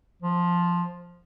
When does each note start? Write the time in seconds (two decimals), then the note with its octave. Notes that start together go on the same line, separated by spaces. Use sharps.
0.22 F3